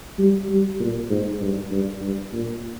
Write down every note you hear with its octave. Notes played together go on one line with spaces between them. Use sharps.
G3
G3
A#2
G#2
G2
G2
G2
A#2